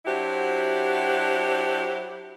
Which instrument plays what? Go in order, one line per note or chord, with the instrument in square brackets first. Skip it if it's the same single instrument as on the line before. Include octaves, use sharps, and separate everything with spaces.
[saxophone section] F#3 D4 E4 F#4 G4 C5